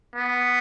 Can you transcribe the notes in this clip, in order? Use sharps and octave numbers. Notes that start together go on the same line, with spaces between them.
B3